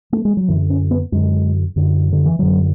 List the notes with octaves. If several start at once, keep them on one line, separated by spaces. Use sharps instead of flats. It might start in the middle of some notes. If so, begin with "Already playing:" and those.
A3
G#3
F#3
F#2 D3 E3
C#4
B3
F#2 D3 G#3
F#2 D3
D3
E3
F#2 D3 F#3